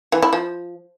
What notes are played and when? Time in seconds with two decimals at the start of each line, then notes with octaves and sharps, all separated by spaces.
0.12 E3
0.22 E4
0.33 F3